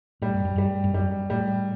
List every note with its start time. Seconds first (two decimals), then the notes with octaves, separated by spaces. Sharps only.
0.22 A2 G3
0.34 G2
0.45 F#2
0.56 G2 G3
0.84 G2
0.94 F#2 G3
1.30 A2 G3